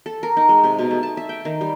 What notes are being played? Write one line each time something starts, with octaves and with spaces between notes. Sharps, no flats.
A4
A#4
D#4
G#3
C3
B2
A3
A5
E5
G5
D#3
G3